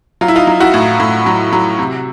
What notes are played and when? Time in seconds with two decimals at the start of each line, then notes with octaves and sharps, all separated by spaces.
0.21 F#3 F4
0.28 E4
0.36 D#4 F4
0.47 F#3
0.60 E4 F#4
0.74 A2
1.00 A2
1.26 F#3
1.53 F#3
1.79 C3